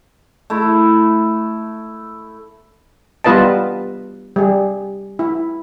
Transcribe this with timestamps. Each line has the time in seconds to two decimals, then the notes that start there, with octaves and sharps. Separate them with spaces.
0.50 A3 E4
3.24 G3 B3 F4 B4 D#5 A5
4.36 G3 G#4
5.19 E4